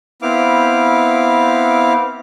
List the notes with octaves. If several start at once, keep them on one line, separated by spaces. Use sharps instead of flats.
B3 C4 E4 F5 D6